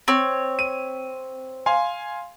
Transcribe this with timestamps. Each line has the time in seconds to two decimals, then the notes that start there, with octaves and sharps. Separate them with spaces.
0.08 C4 C#5
0.59 D#7
1.66 F5 G#5 C6